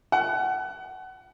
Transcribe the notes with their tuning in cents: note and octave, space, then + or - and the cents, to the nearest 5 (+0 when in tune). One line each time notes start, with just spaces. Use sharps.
F#5 +25